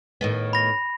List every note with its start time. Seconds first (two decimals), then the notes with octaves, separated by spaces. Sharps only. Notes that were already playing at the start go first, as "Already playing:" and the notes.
0.21 A2 D#3 B3
0.53 B5 A#6